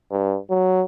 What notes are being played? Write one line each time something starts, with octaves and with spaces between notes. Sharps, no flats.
G2
F#3